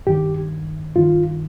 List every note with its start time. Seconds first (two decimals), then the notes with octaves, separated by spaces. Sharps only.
0.07 G2 D#3 G4
0.96 G2 D#3 F4